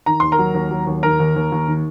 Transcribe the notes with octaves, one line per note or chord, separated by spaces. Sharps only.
D#3 A#5
D#2 C6
A#4 A#5
F#3
D#2
F#3
D#2
D#3 A#4 A#5
D#2
D#2
D#2
D#3